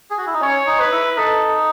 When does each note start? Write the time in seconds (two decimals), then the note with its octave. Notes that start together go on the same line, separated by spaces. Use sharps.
0.11 G#4
0.18 F#4
0.27 E4
0.34 D#4
0.41 C#4 C#5
0.67 D#4
0.80 B4
0.92 E4
1.17 D#4 A4